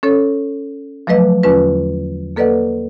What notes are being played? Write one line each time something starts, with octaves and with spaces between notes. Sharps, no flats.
C#4 A4 C#5
F3 F#3 A3 B4 D#5
E2 D3 C#4 F4 B4
A#3 A4 B4 D5 D#5 F#5